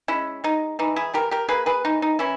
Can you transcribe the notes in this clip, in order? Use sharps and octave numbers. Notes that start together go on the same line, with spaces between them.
G#3 C#4 E4
G#3 D#4
E3 D#4
E4 G#4
E3 G4 A#4
G4 A#4
A#3 G#4 B4
G#4 B4
E3 D#4
D#4
E3 C#4 E4